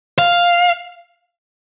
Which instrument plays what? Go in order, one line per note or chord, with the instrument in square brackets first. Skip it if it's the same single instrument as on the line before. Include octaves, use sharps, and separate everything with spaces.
[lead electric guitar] F5